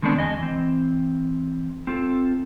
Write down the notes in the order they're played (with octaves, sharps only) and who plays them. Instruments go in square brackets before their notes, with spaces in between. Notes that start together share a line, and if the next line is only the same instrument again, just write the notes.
[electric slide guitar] D3 D#3 G#3 B3 C4 D4
E2 D#5 G#5
E3 C4
C4 F4 A4